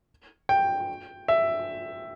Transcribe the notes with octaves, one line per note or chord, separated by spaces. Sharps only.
G5
E5